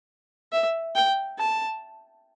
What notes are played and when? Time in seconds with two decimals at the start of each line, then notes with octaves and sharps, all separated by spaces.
0.52 E5
0.95 G5
1.38 A5